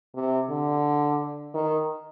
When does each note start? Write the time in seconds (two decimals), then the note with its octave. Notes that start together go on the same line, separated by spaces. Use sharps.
0.15 C3
0.50 D3
1.54 D#3